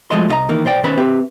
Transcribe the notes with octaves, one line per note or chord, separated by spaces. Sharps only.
F3 F#3 G#3 A3 D#5 C6
C2 C#4 F4 D#5 A#5
D#3 E3 A#3
B1 C5 D5 G5
D#3 C#4 B4 C5 B5 C6
C4 G4 B4 E5